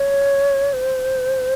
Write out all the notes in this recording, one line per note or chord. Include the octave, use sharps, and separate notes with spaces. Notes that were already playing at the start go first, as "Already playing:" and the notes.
Already playing: C#5
C5